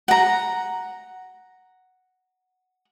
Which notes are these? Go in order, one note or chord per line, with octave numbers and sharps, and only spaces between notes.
F#5 A#5